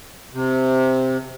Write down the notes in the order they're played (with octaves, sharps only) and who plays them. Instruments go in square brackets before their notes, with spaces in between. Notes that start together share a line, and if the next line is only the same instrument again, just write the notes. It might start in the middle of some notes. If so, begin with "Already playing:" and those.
[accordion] C3